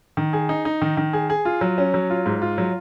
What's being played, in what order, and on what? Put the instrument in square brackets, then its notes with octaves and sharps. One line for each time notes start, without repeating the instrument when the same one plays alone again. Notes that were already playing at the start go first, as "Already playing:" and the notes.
[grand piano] D#3
G#4
D#4
D#4
D#3
D#3
G#4
G#4
F4
F#3
C#4
F#3
F4
G#2
F4
F#3